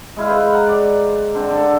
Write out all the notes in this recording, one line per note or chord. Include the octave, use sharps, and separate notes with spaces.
G#3 E4 F5
B4 C5
F#5 A#5
D5
D3 C4
D3 A4